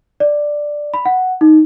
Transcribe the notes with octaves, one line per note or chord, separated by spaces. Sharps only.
D5
B5
F#5
D#4